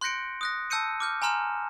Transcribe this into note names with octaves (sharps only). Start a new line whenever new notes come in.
C6 F#6 G6 A#6 C#7 D7
D#6 F#6 A#6
A5 E6 G6 C#7 D#7
D6 F6 G6
G#5 A#5 C6 F6 E7